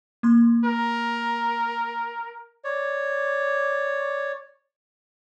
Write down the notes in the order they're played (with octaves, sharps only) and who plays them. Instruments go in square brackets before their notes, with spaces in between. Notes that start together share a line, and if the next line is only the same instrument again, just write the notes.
[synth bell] A#3 C6
[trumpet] A#4
[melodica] C#5 D5